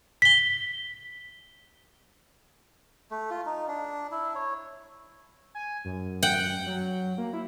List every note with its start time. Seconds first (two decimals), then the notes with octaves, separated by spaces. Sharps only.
0.22 B6 G7
3.11 A3
3.31 F4
3.46 D#4
3.68 D4
4.12 E4
4.35 C#5
5.55 G#5
5.85 F#2
6.23 F#5 G5
6.66 F#3
7.18 A#3
7.33 E4